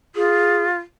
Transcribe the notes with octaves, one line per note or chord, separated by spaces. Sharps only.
F4 G#4